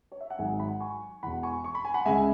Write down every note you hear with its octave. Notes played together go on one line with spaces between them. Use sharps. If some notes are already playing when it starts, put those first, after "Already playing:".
C#5
E5
F#5
G#1 G#2 F#3 E5 G#5
F#5 B5
G#5 C#6
E1 E2 E3 F#5 B5
G#5 C#6
C#6
B5
G#5
F#5 B5
C#2 C#3 G#3 E5 G#5